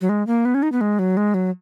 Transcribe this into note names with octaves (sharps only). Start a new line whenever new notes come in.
F#3
G#3
A#3
B3
C#4
D#4
B3
G#3
F#3
G#3
F#3